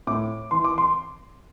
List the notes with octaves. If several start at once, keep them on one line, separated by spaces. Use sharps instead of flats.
A2 D6
E3 C6
D6
C6